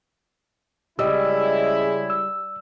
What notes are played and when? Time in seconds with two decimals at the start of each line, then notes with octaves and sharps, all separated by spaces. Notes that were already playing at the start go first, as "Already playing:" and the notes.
0.99 C#3 G3 G#3 E4 D#5 E6
2.10 E6